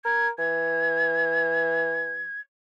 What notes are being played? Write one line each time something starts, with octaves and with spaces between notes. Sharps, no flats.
A#4 G#6
E3 G#6